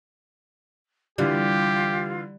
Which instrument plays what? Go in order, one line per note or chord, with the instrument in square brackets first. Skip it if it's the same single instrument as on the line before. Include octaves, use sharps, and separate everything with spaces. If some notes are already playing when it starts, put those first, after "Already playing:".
[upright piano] D3 E3 [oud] G3 [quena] F4 [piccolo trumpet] G4